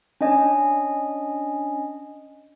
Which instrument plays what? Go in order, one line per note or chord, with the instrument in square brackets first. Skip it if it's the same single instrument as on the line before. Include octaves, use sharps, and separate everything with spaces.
[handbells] C#4 D4 D#5 G#5